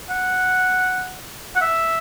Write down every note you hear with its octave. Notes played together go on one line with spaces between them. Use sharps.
F#5
F#5
E5